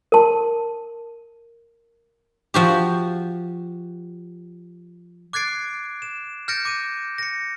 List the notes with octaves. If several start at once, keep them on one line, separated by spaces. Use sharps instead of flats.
A#4 A5
F3 F#4 G4
D6 F#6 G#6 A6 C7 D7
E7
F6 G6 A6 A#6 C#7 D7
D6 D#7
A#6 C#7